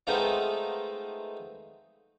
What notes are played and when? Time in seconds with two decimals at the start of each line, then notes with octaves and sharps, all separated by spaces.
0.07 G#3 A3 B3 C4 D#4 F4